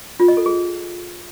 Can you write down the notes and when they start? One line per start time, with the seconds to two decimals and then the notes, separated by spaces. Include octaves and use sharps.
0.20 F4
0.28 D#5
0.37 A4
0.46 G#4